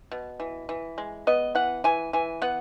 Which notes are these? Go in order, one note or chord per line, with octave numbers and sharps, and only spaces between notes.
B2
E3
E3
G#3
B3 D#5
E3 F#5
E3 G#5
E3 G#5
B3 F#5